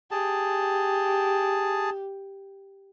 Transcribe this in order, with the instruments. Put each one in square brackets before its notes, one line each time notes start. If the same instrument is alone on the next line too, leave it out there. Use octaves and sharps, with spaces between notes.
[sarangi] G4 [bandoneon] G#4 A5